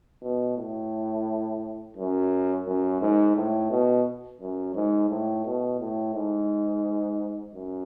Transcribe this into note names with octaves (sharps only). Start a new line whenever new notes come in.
B2
A2
F#2
F#2
G#2
A2
B2
F#2
G#2
A2
B2
A2
G#2
F#2